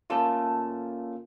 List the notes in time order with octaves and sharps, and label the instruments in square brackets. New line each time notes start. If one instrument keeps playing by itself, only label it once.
[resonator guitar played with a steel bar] A3 A4 A5 [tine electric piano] A#3 C#4 F4